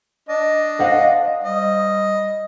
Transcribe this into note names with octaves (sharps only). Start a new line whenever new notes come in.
D4 D#5
C5 F5 F#5
G3 D#5